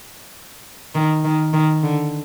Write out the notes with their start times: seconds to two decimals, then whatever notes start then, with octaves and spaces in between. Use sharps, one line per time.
0.95 D#3
1.24 D#3
1.53 D#3
1.83 D3